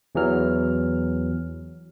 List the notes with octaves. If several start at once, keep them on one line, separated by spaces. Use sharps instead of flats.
E2 E3 F#3 F6